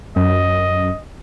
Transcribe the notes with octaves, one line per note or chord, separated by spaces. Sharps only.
F#2 D#5